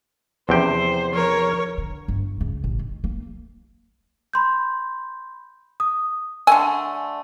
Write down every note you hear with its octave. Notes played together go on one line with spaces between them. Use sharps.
E2 C3 F3 C#4 C5 G5
F3 A#4 C#5
D3
G1
C#2
A1
D#3
A#3
B5 C6 G6
D#6
D3 A3 G#5 E6